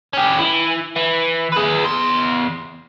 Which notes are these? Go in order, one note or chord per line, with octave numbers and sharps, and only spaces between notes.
C#4 G4
E3
E3
G#4 B4
E2 C6